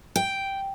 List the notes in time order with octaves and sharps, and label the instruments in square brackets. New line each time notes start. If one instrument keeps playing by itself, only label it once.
[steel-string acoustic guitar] G5